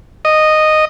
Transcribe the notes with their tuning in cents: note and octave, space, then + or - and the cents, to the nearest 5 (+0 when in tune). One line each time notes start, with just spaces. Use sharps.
D#5 -10